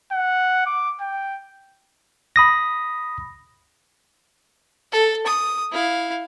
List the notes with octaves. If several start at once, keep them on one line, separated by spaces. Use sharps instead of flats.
F#5
D6
G5
B5 D#6 A#6
A4
D#6
E4 F5